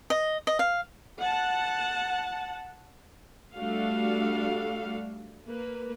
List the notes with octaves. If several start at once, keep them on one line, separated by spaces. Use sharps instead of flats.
D#5
D#5
F5
F#5 A5
G3 A3 D4 F#4 A4 F5
A#3 B4